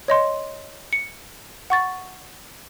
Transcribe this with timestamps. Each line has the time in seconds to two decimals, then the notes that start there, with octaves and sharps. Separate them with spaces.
0.08 C#5 D#5 C6
0.93 C#7
1.70 F#5 C#6 A6